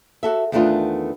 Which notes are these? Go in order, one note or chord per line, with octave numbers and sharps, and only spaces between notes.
F#4 A4 E5
E2 D#3 A3 B3 D4 F4